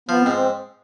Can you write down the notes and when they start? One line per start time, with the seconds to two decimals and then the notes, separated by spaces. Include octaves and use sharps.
0.09 F3 B3
0.21 C4
0.26 G#2
0.34 C4